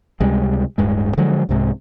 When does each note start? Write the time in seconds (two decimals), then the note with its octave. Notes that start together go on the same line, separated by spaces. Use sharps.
0.20 C#2 C3 G3 G#3
0.78 D1 G2 G#3
1.17 D3 F3 F#3 G#3
1.49 C2 G#2 C3 G#3